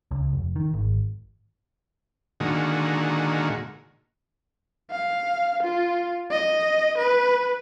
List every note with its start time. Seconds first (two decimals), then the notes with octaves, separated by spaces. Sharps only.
0.11 C#2
0.33 F1
0.56 D#3
0.74 G#1
2.40 A#2 D3 D#3 G#3 F#4
4.91 F5
5.63 F4
6.31 D#5
6.97 B4